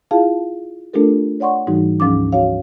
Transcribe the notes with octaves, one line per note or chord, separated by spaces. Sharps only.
E4 F4 G#4 F5 A5
A3 D4 F4 G4 A4 A#4
C#5 D5 F#5 C6 C#6
G#2 E3 G3 D#4 F#4
D2 G#2 F3 C#4 D6
F#4 C#5 F5